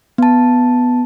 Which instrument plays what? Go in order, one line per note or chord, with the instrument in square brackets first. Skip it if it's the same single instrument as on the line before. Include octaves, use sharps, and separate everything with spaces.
[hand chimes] B3 A5